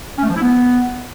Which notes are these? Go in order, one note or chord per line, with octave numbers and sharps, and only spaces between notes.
C#4
A3
F3
E4
B3